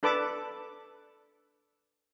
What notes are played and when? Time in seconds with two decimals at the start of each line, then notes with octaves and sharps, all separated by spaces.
0.03 D4 A4 B4 A5 D6